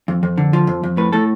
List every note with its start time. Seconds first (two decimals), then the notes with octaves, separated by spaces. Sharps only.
0.08 F2
0.23 F2
0.38 D3
0.53 F3
0.67 F2
0.83 F2
0.97 A2 B4
1.12 A2 A4